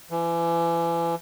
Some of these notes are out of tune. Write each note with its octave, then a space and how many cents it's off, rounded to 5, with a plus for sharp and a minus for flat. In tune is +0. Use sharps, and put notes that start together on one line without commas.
E3 +35